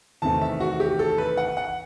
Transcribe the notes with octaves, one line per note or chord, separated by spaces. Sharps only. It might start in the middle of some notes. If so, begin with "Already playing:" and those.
E2 C3 D#3 A3 A5
E5
F#4
G4
A4
B4
F#5
F#5